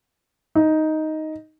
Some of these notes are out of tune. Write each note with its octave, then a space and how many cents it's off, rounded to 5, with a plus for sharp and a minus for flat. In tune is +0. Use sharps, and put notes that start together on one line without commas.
D#4 +5